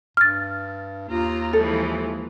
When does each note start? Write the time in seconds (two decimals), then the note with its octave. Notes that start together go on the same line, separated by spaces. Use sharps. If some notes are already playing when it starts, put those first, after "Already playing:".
0.17 G2 F6 A6
1.08 D#2 F4 A#5
1.53 E3 F3 G#3 A4